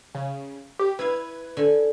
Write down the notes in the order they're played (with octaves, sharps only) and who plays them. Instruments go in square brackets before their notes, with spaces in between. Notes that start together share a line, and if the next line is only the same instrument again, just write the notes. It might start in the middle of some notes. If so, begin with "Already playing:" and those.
[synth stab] C#3
G4
[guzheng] E4 F5 [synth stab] B4 G#6
[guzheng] D3 G#5